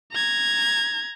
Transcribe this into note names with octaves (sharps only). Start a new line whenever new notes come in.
A#5 G#6